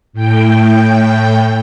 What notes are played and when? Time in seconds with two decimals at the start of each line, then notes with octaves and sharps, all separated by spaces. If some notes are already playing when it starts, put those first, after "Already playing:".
0.13 A2 G5